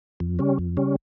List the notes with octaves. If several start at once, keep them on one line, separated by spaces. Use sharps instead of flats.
F2
C#3 G3 C#4
F2
C#3 G3 C#4